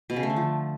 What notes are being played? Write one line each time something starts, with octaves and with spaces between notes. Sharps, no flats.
B2
C#3
A3
D3
F3